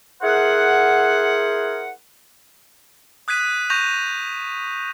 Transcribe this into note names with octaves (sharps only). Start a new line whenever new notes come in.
E4 G#4 A#4 C5 F#5
D#6 F#6 G#6 B6 D#7
C#6 G6 A#6 D#7 F7